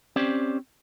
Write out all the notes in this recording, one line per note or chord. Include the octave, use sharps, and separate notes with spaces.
C4 C#4 G4 C5 D5